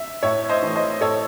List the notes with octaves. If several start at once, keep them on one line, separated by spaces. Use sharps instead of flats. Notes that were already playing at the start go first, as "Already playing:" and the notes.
Already playing: E5
A2 C#5 E5
C5 D#5
E3 A3
C5 D#5
A2 A4 C#5